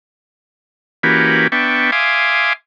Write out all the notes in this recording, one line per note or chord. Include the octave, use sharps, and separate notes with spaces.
E3 A#3 C#4 F#4 G4 B4
B3 D4 E5 G5 C#6
E5 F5 G#5 C6 D6 D#6